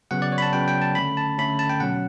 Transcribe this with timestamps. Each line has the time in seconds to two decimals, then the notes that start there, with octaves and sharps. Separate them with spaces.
0.11 C#3 F#3 B3 F#5
0.22 D5
0.32 C#5
0.38 B5
0.42 A5
0.53 C#3 F#3 B3 G5
0.68 G5
0.82 A5
0.95 D3 A3 C#4 B5
1.17 A5
1.38 D3 A3 C#4 B5
1.59 A5
1.70 G5
1.80 B2 F#3 C#4 F#5